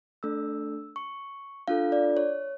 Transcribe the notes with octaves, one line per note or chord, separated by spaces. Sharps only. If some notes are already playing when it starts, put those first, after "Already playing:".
A3 D4 A4 E6
C#6
D4 F4 A4 F5
D5
C#5